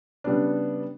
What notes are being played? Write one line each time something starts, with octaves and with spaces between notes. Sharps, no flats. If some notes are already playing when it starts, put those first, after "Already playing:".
C#3 G3 B3 D4